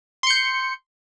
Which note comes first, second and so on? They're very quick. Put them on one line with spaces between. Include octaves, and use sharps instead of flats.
C6 C#7 G6